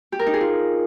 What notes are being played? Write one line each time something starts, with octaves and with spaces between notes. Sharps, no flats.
G4
A#4
D#4
G#4
F4